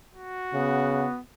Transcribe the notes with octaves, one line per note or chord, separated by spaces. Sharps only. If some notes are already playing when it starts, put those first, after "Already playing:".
F#4
C#3 B3